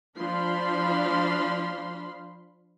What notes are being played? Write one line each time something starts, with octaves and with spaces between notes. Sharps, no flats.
F3 D4 F5 B5 C6